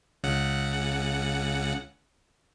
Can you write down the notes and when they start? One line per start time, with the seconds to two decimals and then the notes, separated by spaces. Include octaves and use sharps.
0.24 C#2 C#3 F#5